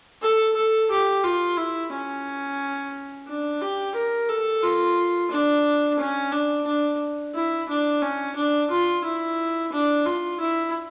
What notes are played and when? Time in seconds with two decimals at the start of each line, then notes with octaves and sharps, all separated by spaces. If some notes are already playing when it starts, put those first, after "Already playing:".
0.22 A4
0.55 A4
0.90 G4
1.23 F4
1.57 E4
1.92 C#4
3.27 D4
3.61 G4
3.95 A#4
4.29 A4
4.63 F4
5.31 D4
5.99 C#4
6.32 D4
6.66 D4
7.34 E4
7.69 D4
8.02 C#4
8.36 D4
8.70 F4
9.04 E4
9.72 D4
10.05 F4
10.40 E4